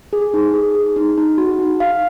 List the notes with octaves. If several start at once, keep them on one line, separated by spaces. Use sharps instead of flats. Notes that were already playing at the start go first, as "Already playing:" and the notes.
G#4
D#4
G#4
G#4
D#4
D#4
F#4
D#4
F5